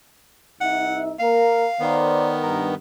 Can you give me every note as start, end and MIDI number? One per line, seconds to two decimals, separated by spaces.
0.61 1.12 36
0.61 1.12 63
0.61 1.12 76
0.61 0.99 78
1.19 1.63 58
1.19 1.63 70
1.19 2.02 77
1.80 2.75 51
1.80 2.75 59
1.80 2.34 70
1.80 2.34 72
1.80 2.34 74
2.43 2.73 43
2.43 2.69 70